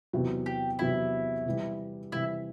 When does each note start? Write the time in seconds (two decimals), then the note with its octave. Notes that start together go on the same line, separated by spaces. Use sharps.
0.13 E2 C3 F#3
0.46 G4
0.79 E2 C3 F#3 E4
1.46 C3 E3 G3
2.12 C3 E3 G3 E4